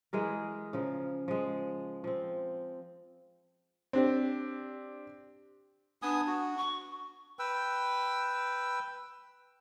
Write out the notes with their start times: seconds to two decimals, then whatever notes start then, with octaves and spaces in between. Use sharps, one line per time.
0.13 E3 G#3 G#4 A#4
0.73 C#3 F3 A#4
1.28 F3 G#3
2.04 F3 C4
3.93 C4 D4 G4
6.02 B3 D4 G#5 D#6
6.27 F#4
6.57 C#6
7.39 B4 G5 E6